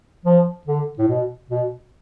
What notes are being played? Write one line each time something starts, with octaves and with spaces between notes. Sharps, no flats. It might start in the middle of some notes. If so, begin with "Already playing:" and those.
F3
D3
A2
B2
B2